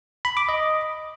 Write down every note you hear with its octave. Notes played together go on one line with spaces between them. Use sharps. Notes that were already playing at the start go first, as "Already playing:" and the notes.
B5
D6
D#5